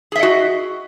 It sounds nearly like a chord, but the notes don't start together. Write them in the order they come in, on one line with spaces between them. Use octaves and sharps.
G#4 E5 D#5 F#4